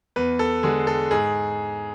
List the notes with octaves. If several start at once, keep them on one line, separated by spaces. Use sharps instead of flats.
E2 B4
A4
D3 G#3 G#4
A4
G#2 G#4